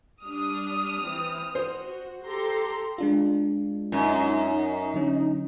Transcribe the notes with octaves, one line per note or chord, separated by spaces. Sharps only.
G3 D4 D#6 F6
E3 C4
F#4 C5
G4 A4 A#5 C6
G#3 D4 F4
F#2 D#4
D3 F#3 C#4